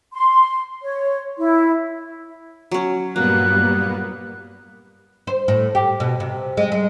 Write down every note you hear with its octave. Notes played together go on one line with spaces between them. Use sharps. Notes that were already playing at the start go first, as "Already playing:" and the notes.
C6
C#5
E4
F#3 C#4
G2 A#2 F#3 G3 A#3 B3 F#6
C5
A2
G4
B2
C3
G#3
G#3